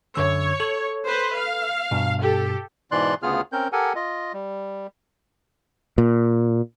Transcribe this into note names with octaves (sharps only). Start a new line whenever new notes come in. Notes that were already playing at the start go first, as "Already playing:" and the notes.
F#2 D3 C#5 E6
A4
B4 C5
F5
G2 B2
G4 A4
G#2 B2 E3 D5 C6 F#6
D2 C#3 B3 F4 G#4 F6
C4 C#4 A#4 G6
G4 A4 A#4 F#5 G#5
F4 D#5
G3
A#2